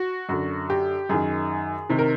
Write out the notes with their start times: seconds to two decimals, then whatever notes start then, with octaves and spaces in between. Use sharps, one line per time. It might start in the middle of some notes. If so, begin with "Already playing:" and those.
Already playing: F#4
0.29 F#2 D3 F#4
0.70 G4
1.09 F#2 D#3 G#4
1.89 C3 D#3
1.99 A#4